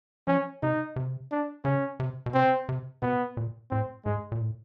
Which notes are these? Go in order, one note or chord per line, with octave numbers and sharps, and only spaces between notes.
F3 C#4
C3 D#4
C3
D4
C#3 C#4
C3
B2
C3 C4
C3
B2 B3
A#2
A2 C4
G#2 G#3
A#2
A2